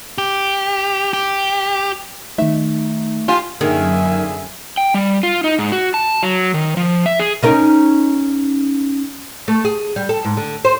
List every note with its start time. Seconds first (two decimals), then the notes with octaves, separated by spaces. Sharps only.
0.18 G4
1.13 G4
2.38 D#3 A3 D#4 E5
3.28 F4 G4 G#5
3.61 F#2 D3 D#3 A#3 G#4 E5 G#5
4.78 G5
4.94 G3
5.23 F4
5.44 D#4
5.59 G#2
5.72 F#4
5.94 A5
6.23 F#3
6.54 D#3
6.77 F3
7.06 E5
7.20 G#4
7.43 C#4 D#4 A#4
9.48 A3
9.65 G#4
9.96 G3
10.09 A4
10.25 G#2
10.37 D3
10.65 C5